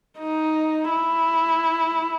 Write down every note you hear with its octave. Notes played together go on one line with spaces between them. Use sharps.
D#4
E4